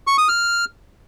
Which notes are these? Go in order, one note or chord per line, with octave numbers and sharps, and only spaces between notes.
C#6
D#6
F6